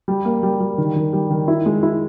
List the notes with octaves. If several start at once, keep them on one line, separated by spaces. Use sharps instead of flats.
G3
A#3
G3
G3
D#3
D#3
G3
D#3
E4
G#3
E4